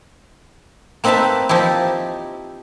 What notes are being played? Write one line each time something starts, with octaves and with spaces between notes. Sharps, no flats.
A#3 C4 D#4 B4 E5 A5
F3 D#4 E4 G4